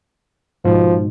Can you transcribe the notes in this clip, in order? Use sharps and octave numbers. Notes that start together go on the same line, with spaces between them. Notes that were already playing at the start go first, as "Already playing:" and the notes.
G#2 B2 F3